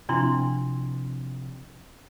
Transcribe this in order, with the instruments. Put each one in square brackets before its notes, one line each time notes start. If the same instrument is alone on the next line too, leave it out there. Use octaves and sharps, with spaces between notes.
[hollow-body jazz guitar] C3 F3 [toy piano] D4 E4 C6